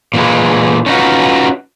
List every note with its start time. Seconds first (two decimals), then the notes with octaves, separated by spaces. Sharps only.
0.14 A#2 E3 G3 G#3
0.86 C#4 D#4 F4 F#4 B4